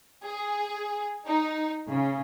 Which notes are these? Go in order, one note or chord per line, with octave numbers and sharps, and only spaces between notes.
G#4
D#4
C#3